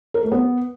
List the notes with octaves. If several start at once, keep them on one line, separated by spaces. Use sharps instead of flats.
A#4
A3
B3